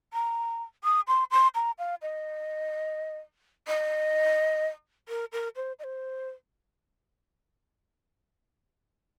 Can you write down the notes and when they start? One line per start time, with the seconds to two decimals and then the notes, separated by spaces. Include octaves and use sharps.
0.13 A#5
0.84 D#6
1.08 C6
1.31 C6
1.55 A#5
1.79 F5
2.02 D#5
3.68 D#5
5.08 A#4
5.32 A#4
5.56 C5
5.79 D#5
5.84 C5